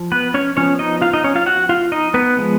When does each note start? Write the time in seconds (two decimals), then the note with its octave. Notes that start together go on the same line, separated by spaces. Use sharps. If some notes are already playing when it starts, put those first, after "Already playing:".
Already playing: F3
0.12 B3 B4
0.34 C#4 C#5
0.57 F3 B3 C#4 C#5
0.79 D#4 D#5
1.01 F4 F5
1.13 D#4 D#5
1.24 C#4 C#5
1.35 F4 F5
1.46 F#4 F#5
1.69 F4 F5
1.92 D#4 D#5
2.14 B3 B4
2.37 F3 G#3 B3